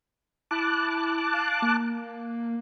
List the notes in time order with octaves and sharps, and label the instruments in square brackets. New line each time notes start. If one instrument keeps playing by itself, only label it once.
[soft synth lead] E4 [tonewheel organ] A5 D6 F#6
[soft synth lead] F5
A#3